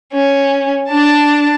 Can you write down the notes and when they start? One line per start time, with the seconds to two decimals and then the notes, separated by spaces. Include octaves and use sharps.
0.13 C#4
0.89 D4 A5